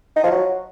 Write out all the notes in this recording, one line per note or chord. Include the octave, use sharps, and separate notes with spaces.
D#4
F3
F#3